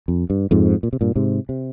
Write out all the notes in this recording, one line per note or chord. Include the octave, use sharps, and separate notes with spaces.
F2
G2
F2 G#2
A#2
C3
G2 A#2
G#2 C3
C3